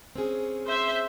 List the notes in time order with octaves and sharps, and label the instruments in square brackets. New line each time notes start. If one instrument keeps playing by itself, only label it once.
[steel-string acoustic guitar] C4 C#4 G#4
[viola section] C5 E5